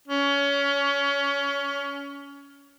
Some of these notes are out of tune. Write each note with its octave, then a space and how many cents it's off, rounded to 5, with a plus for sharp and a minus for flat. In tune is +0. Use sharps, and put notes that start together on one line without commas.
C#4 +25